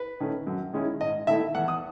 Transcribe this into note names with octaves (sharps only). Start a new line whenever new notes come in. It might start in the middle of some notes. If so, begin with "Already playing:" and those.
Already playing: B4
D#3 A3 C#4
F#2
D#3 G#3 C#4 E4
G#2 D#5
D#3 A3 E4 E5
E2 F#5
D#6